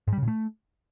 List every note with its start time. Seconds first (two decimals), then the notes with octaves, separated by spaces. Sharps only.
0.07 G#2
0.13 G3
0.18 C#3
0.23 A#2
0.28 A3